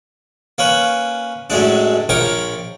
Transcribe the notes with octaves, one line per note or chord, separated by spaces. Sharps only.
A#3 C#4 B4
F#2 A2 G#3 D4
A#1 A#4 C#5 G5 D6